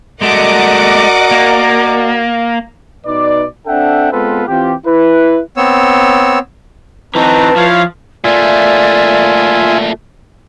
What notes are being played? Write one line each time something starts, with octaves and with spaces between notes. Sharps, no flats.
G#3 A3 F#4 A#4 D5 D#5 F#5 D6
A#3
B2 D#4 B4 D5
C4 D4 A4 E5 F#5 G5
G#3 B3 C4 F4 A4 B4
E3 C4 F4 G4
E4 B4
B3 C4 C#5 E6
E3 C4 D#4 B4 A5 A#5
F3 E4 C#5 F5
A#2 A3 F4 D5 E5 G#5